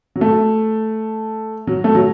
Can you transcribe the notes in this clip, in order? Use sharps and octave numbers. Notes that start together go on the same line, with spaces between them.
F#3
A3
F#3
A3
F#3